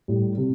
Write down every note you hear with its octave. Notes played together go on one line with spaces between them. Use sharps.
A2 G3
C3